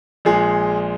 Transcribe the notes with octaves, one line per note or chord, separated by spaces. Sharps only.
A#1 A#2 G#3 G#4